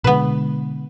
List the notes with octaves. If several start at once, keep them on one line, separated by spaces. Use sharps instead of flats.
B2 D3 G#3 B3 B4